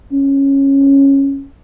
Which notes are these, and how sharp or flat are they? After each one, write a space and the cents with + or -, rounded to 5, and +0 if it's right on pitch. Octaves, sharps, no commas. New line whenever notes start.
C#4 -10